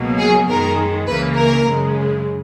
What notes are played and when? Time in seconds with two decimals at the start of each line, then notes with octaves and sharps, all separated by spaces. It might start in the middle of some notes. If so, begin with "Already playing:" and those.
Already playing: C#2 B2 F#3 A#3
0.19 G#4
0.49 F#2 D#3 G#3 A#4
1.08 C#2 C#3 E3 A#3 B4
1.37 A#4
1.67 F#2 C#3 G#3